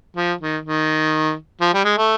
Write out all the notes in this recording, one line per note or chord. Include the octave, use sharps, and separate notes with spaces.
F3
D#3
D#3
F3
G3
G#3
A3